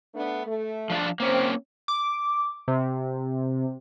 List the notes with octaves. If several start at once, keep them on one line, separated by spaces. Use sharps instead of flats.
A3 B3 D4
A3
F3 D4 F4
A#3 C4 C#4
D6
C3